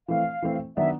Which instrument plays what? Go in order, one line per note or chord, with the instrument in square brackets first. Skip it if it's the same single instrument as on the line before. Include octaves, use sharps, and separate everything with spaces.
[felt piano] E3 A3 C4 [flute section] F5
[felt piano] E3 A3 C4
[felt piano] D#3 F#3 B3 D4 [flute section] E5